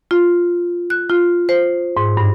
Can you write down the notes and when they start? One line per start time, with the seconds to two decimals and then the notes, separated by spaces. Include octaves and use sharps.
0.11 F4
0.90 F#6
1.09 F4
1.49 C5
1.97 G#2
2.17 G2